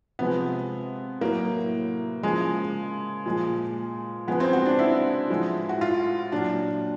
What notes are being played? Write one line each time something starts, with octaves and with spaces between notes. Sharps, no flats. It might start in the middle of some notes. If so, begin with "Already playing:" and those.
C3 F3 G#3 B3
A2 F#3 A#3
C#3 F3 G#3
A#2 F3 G#3
C#3 F3 G#3 B3
C4
F#4
D4
E4
A2 F3 G#3
F#4
F4
A#2 F#3 D4